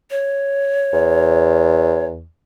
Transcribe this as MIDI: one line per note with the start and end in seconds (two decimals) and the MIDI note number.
0.11 2.06 73
0.93 2.26 40